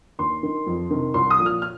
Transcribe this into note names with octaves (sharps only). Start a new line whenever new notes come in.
D#2 C6
D#3
F2
C3 D#3
C2 C6
D#6
A#2 F3
F6
F6